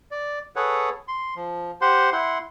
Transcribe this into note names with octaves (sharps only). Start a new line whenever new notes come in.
D5
G#4 A4 B4 C#5 F#5
C6
F3
G4 C5 F#5 C6
E4 F#5 C6